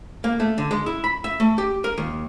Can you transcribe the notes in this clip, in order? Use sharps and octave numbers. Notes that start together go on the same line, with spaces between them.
A#3
A3
D3
G#3
E4
B5
E5
A3
G4
A#4
D#2